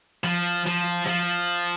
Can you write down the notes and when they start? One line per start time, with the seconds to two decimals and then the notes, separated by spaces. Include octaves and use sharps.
0.24 F3
0.66 F3
1.07 F3